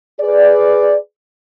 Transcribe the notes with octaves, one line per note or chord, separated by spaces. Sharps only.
G#4 B4 D5